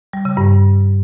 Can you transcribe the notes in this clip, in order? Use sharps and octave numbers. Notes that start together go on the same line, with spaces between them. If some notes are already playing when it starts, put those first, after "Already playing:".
G3
C#3
G2